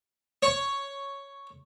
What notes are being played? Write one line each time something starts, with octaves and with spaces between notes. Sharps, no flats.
C#5